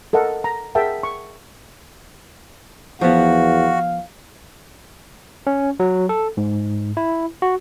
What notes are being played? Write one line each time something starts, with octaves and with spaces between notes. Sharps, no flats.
A4 A#4 D#5 F#5
A#5
G#4 A#4 E5 F#5 G5 A5
C#6
E2 F3 B3 F#4 F5
C#4
F#3
A4
G#2
E4
F#4